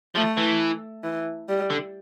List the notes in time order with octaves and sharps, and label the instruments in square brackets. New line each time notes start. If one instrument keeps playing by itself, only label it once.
[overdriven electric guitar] F3 [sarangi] A3
[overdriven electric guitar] E3
[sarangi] E3
G3
[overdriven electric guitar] D3